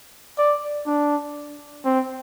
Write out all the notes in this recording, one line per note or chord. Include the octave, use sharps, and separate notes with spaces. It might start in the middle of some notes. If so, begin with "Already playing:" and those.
D5
D4
C4